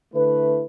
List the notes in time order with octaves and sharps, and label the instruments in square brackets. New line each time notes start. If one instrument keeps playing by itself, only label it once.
[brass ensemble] D3 A3 E4 B4